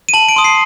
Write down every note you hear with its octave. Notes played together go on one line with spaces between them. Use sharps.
D#7
A5 F#7
D7
C6 D#6
C7